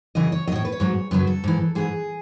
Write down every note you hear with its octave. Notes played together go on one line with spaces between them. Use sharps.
F#2 C#3 E3 D#5
C#5
F#3 D#5
A2 C#5
B4
C#5
G#2 F#3
F#2 C#3 F#3 B4
A4
G#2 E3
G#2 E3 G#4